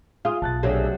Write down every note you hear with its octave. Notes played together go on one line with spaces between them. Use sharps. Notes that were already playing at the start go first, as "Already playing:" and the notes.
F4 G#4 D#6
B1 A5 F#6 A6
C3 F#3 A3 D4 G#4